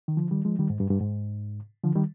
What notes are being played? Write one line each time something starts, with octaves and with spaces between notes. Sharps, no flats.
D#3
D3 F3
D#3 G3
F3 G#3
D#3 G3
G#2
G2
G2
G#2
D3 F3
D#3 G3